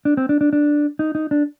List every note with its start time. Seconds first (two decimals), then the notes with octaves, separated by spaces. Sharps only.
0.05 D4
0.17 C4
0.29 D4
0.41 D4
0.53 D4
0.99 D#4
1.15 D#4
1.31 D4